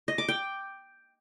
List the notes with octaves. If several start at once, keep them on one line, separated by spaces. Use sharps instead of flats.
D#5
D6
G5